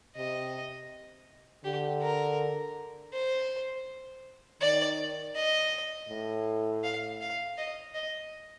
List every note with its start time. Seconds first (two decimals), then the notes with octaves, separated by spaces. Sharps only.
0.16 C3 D#5
1.64 D3 G4
2.02 A#4
3.14 C5
4.61 D#3 D5
5.36 D#5
6.09 A2
6.84 F5
7.21 F5
7.58 D#5
7.95 D#5